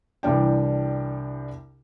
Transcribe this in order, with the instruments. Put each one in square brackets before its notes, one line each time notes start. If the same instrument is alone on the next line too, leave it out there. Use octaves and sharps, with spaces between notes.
[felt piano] C2 E3 G3 D4 G5